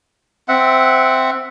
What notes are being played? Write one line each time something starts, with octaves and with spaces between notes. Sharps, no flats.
C4 E5 F#5